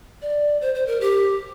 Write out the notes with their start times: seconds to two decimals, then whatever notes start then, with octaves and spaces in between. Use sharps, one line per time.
0.22 D5
0.61 C5
0.75 C5
0.87 A#4
1.01 G4